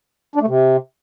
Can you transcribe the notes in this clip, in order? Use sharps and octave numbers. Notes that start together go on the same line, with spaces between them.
D4
A3
C3